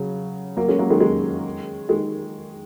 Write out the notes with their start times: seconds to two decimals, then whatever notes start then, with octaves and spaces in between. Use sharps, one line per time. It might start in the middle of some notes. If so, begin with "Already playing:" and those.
Already playing: C#3 F#3
0.57 F#3 A#3
0.68 G#3 C#4
0.79 F#3 A#3
0.90 D#3 G#3
1.00 D#3 G#3
1.89 D#3 G#3